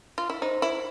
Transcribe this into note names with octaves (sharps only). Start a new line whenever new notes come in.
F4
E4
D#4 C5
E4 E5